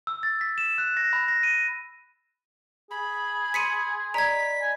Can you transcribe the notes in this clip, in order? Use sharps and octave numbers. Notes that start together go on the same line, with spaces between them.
E6
A6
B6
E7
F#6
A#6
B5
A#6
D#7
G#4 B5
C6 D#6 B6 C#7 D#7
D5 D#5 A#5 B5 G#6 B6
G#5